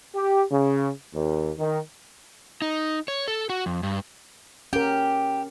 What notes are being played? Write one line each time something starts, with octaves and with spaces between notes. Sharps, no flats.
G4
C#3
D#2
D#3
D#4
C#5
A4
F#4
F2
G2
C#4 G4 A#4